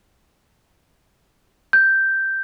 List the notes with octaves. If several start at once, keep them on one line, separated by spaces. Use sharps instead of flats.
G6